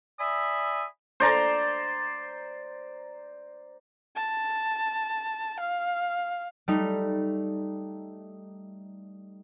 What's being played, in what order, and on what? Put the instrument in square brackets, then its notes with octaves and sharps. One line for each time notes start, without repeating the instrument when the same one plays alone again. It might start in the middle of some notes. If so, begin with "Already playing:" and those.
[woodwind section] D5 E5 G#5 B5 D#6 E6
[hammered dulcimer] C5 D5 A#5
[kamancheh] A5
F5
[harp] G3 A3 D#4